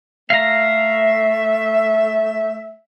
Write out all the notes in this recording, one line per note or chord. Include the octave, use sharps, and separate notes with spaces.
A3 E5 F5 A#5